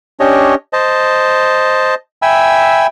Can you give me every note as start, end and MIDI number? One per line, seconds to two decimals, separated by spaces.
0.20 0.55 61
0.20 0.55 62
0.20 0.55 67
0.20 0.55 73
0.20 0.55 75
0.73 1.95 72
0.73 1.95 75
0.73 1.95 81
2.22 2.87 76
2.22 2.87 79
2.22 2.87 80
2.22 2.87 83
2.22 2.87 88